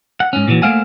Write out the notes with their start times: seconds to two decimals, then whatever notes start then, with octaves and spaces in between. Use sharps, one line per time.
0.20 F#5
0.33 G#2 C#4
0.48 A#2 D3 E3 F#3
0.62 A3 A#3 C5 F5 F#5 G#5